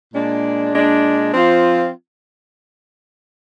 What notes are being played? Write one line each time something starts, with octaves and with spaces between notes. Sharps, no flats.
A#2 G#3 D4
A#2 G#3 D4
F3 C4 F4